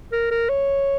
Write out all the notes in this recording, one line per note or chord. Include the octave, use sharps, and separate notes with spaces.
A#4
A#4
C#5